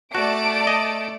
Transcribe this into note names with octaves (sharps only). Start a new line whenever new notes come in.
A3 F#4 D5 A5 D7
D#5